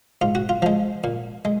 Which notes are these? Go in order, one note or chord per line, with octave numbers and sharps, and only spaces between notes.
G#2 F4
F#4
F4
F3 G#3
A#2
G#3